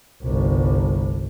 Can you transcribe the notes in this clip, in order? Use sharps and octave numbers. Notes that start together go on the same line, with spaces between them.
G1 C2